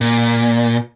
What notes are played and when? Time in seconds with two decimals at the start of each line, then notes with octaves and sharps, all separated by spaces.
0.01 A#2